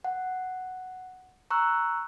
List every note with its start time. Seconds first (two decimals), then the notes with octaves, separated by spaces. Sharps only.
0.04 F#5
1.50 A#5 C#6 E6 F#6